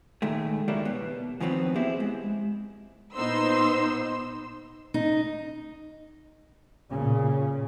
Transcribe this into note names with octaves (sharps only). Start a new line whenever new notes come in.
A#2 D#3 G#3 A3
D#3 F#3 G3 A#3 D4 E4
B2 B3
F#2 D#3 F3 F#3 B3 C4
B3 C4 E4 G4 G#4 C5
G#3
A#2 B3 D#4 C5 C6 E6
D#4
A#2 C#3